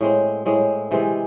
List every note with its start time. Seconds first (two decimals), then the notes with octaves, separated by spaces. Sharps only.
0.01 A2 G#3 C4
0.46 A2 G#3 C4
0.91 C3 E3 G#3 C4